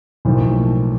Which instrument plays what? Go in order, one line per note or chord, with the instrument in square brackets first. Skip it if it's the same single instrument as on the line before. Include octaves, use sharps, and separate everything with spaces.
[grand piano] B1 A2 F3 A#3